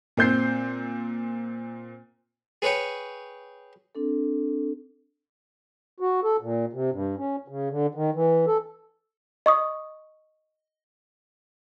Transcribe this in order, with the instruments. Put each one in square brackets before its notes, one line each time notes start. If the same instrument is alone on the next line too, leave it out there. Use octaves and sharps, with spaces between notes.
[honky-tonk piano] A#2 C4 G6 C7
[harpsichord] G#4 B4 C#5 G5
[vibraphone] C4 D4 A4
[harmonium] F#4
A4
A#2
C3
G2
C#4
C#3
D3
D#3
E3
A4
[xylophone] D#5 C#6 D#6